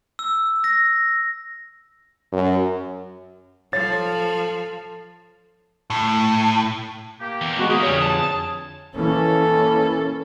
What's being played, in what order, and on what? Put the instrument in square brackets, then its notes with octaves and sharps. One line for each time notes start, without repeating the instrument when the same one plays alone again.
[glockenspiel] E6
A#6
[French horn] F#2
[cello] F3 [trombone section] A4 [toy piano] C#5 [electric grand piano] A6
[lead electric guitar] A2
[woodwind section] A#3 G4
[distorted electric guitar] E2
[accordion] G#3 F#4 [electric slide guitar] B3
[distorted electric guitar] A#3 [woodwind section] G#4 [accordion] D#6
[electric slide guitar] F2 D3 C#5 [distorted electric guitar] G3
[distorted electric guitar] A5
[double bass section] E3 A#3 C#4 [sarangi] A4